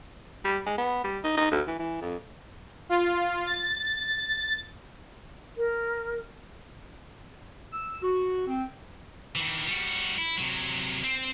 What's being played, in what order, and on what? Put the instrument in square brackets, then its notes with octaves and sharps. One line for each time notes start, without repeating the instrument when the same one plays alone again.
[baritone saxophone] G3
G#3
B3
G3
D#4
D#4
D2
E3
E3
F2
[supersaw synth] F4
A6
[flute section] A#4
[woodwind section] E6
F#4
C4
[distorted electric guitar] D#3 E3
G3 F#4
E4
C3 F#3
C4